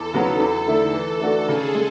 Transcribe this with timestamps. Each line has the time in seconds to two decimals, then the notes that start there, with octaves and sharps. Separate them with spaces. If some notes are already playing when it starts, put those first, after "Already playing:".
Already playing: E2 A4
0.13 C#3 F#3 B3 F#4
0.40 E2
0.67 D3 A3 E4
0.93 E3
1.20 A3 D4 F#4
1.47 C#3 G#4
1.75 G#3